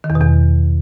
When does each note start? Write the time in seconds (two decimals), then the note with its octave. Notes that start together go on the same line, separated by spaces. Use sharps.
0.04 D#3
0.10 E2
0.15 B2
0.21 E2